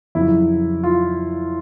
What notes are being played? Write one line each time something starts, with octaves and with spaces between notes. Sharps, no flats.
F2 C#3 F#3 E4
F4